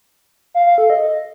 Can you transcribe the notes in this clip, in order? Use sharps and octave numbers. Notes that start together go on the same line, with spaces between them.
F5
F5
A4
D#5